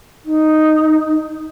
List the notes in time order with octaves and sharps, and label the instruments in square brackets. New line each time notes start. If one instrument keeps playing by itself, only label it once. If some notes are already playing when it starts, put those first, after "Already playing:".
[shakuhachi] D#4